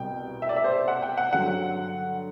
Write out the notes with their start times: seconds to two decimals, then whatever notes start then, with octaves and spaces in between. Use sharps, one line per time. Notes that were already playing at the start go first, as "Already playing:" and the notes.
Already playing: C2 B2 G3 C4 G5
0.42 E5
0.49 D5
0.56 E5
0.64 C5
0.88 F#5
1.02 G5
1.18 F#5
1.33 G2 D3 F#3 F#5